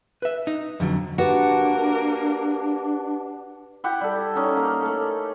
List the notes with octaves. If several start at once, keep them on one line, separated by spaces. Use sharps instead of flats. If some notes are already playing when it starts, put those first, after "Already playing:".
B4 E5
D#4
F2 D3 F#3
A#3 D4 F#4 G4 A#4 B4 F#5
E4 G4 F#5 G5
G3 A4
C#4 D#4 A4
A#3
A3 A4